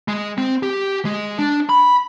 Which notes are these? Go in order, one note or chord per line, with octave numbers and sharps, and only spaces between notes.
G#3
C4
G4
G#3
D4
B5